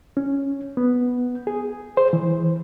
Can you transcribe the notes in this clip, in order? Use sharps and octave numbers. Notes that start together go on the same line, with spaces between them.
C#4
B3
G#4
C5
E3